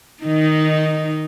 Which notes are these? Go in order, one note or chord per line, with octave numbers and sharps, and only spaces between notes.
D#3 D#4